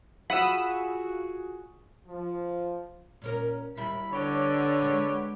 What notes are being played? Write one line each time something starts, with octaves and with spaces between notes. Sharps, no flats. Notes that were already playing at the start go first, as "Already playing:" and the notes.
F4 F#4 G#4 F#5 B5 D#6 E6
F3
A#2 C#4 A#4
D#2 G3 E4 B5
D3 B3 G4 C#5
G#3